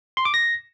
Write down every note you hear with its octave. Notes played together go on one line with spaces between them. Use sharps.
C6
D6
A#6